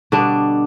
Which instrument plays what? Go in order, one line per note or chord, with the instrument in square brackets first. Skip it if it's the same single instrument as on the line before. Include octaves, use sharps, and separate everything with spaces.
[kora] B2 D3 G3 D4